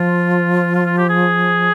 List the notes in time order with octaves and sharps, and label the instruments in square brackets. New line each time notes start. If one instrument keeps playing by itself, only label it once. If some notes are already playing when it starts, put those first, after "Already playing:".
Already playing: [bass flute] F3 [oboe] F4
[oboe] F4
F4
G4
G#4